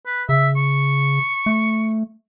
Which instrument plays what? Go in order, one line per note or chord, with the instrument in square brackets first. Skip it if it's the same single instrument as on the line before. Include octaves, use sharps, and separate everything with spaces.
[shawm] B4
[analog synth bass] C#3 [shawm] E5
[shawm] C#6
[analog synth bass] A3